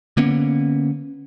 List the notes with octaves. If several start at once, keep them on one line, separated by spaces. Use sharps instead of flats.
D3 A#3 B3 C#4